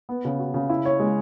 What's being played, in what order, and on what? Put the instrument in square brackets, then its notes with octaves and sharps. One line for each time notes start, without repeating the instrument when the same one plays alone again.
[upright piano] B3
C#3
F#4
C#3
E4
C#5
G#3